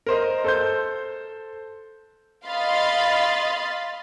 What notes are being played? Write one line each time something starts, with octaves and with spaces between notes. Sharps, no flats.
A#4 C5 D#5
A4 C5 G6
D#5 F5 B5 C6 A6